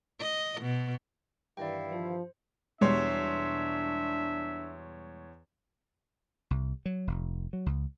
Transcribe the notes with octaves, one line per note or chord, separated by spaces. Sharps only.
D#5
B2
G2 D#3 E3 E4 D5 F5 G5
F3 C5
E2 B2 G3 G#3 D4 C#5 E5 C6
C2
F#3
F1
F#3
C#2